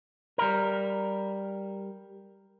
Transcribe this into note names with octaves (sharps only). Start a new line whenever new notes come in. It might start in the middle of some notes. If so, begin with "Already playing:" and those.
G3 A#4